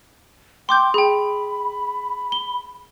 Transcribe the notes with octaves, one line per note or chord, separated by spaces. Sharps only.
G5 C6 D6 G6
G#4 G5 B5
G7